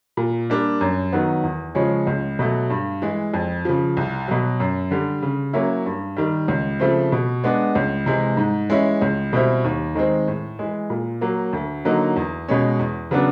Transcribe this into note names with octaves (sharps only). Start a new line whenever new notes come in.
A#2
G3 A#3 D4
F#2
D#3 F#3 B3
E2
C#3 F3 G#3 C#4
C#2
B2 F#3 A3
G2
E3 G#3
F2
C#3 F3
C2
B2 F#3
F#2
D3 G3
C#3
F#3 A#3 C#4 E4
G2
D#3 G3
C#2
C#3 F3 A3 C4
B2
G#3 B3 D4
C#2
C3 E3 G#3
G#2
E3 G#3 C#4 E4
C#2
B2 G3 C4 E4
D#2
D#3 G#3 C4
A2
E3 G#3
A#2
F#3 A#3
D2
D3 F#3 A#3 D#4
E2
B2 G#3 C#4
E2
C#3 F#3 B3 D4